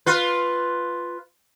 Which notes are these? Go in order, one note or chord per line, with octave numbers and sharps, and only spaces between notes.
F4 B4